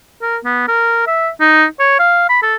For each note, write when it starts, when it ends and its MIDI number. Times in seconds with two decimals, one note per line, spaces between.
0.22 0.38 70
0.45 0.68 59
0.68 1.03 70
1.07 1.29 76
1.40 1.65 63
1.80 1.98 73
1.99 2.28 77
2.29 2.38 83
2.43 2.55 69